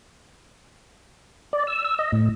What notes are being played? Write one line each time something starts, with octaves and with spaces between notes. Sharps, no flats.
D5
E6
E6
D#5
A2